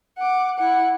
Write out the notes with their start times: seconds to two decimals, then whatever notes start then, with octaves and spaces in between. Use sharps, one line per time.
0.18 F#5 D6
0.58 E4 F#5